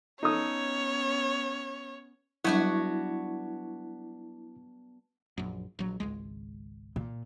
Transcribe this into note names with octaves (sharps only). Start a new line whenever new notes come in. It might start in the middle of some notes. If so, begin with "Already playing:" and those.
B3 C#4 D#4 A4 C#5 D#6
F#3 G3 B3 D4 E4 F#4 C#6 G#6
A#1 F#2
A#1 F#3
G#1 C#2 G#3
A#2